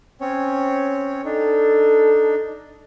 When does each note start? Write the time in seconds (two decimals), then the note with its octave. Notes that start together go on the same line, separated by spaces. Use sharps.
0.21 C4 C#4 C#5
1.25 D4 D#4 A4